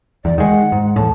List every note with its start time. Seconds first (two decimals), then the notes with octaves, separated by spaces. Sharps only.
0.25 E2 D5
0.38 D#3 G#3 F#5
0.72 G#2
0.96 E2 A2 A5